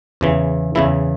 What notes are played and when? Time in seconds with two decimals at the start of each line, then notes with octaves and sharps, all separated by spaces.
0.21 E2 C#3 E3
0.75 E2 C#3 E3 E4